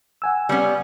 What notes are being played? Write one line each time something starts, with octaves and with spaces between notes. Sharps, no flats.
F#5 G#5 E6
G3 B3 C#4